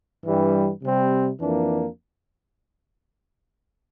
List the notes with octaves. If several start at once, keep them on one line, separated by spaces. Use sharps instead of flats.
G2 E3 G3
C3 G3 C4
F2 E3 A#3 D4